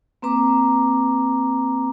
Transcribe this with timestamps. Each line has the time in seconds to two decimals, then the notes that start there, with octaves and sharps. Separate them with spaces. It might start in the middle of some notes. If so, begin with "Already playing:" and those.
0.22 A#3 C4 B4 A#5 D6